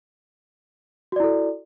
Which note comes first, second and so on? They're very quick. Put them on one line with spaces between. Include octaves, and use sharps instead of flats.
F#4 D5 E4 A4